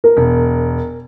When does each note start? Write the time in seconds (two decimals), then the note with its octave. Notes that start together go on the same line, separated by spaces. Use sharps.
0.04 A#4
0.17 E1